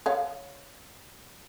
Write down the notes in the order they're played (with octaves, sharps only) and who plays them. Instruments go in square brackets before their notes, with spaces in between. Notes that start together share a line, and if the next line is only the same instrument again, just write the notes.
[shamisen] C#5 F5